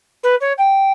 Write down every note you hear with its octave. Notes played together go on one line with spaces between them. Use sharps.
B4
C#5
G5